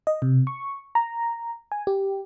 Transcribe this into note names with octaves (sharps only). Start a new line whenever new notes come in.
D#5
C3
C#6
A#5
G#5
G4